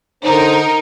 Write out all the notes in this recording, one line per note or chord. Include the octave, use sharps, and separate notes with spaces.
D3 D4 D#4 A#4 C5